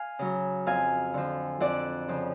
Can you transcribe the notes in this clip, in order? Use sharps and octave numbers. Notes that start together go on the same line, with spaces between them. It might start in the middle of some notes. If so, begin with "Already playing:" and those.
Already playing: F5 G#5
C#3 F#3
F2 F5 G#5
D3 F3
F2 D5 F#5
C#3 F3